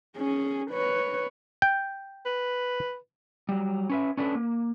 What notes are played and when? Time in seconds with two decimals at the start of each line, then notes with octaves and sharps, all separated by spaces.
0.17 C#4 G#4
0.71 B4 C#5
1.62 G5
2.26 B4
3.49 F#3 G3
3.90 C#4 B4 E5
4.17 C#4 D4 A4 B4
4.35 A#3